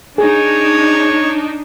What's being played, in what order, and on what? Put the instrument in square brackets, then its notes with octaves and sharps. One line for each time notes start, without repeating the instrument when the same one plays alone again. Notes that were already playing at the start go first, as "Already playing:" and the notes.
[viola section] D4 D#4 [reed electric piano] G#4 [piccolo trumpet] C#5